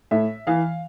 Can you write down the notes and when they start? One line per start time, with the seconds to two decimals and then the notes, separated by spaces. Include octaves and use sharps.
0.11 A2 E5
0.47 E3 F5